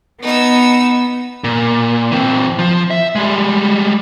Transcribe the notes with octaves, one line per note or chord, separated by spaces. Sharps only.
B3 D#4 E6
A#2
E3 C4
F3
E5
G3 G#3